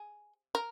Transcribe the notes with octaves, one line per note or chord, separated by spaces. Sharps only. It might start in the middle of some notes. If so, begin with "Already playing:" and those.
Already playing: G#4
A#4